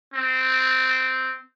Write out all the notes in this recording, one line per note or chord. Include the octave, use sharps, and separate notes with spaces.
C4